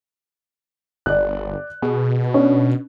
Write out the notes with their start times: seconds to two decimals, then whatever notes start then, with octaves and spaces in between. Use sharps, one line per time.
1.06 G1 D5 F#6
1.82 B2 G#4
2.34 C#4 D4